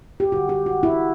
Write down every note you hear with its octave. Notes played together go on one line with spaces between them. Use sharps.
G4
D3 G3 F#4
G4
F#4
E4